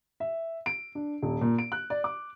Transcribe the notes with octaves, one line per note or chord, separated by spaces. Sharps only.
E5
D7
D4
D#1
A#2
D7
F#6
D5
D6